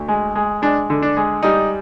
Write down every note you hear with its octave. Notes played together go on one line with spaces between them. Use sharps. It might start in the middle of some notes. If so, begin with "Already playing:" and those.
Already playing: D2
G#3
G#3
G#3 D4
D3
D4
G#3
G3 D#4